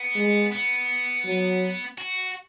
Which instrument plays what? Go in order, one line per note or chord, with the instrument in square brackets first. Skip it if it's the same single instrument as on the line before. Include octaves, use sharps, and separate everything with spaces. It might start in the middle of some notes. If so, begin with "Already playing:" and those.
Already playing: [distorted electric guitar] B3
[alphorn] G#3
[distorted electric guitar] B3
[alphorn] F#3
[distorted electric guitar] F#4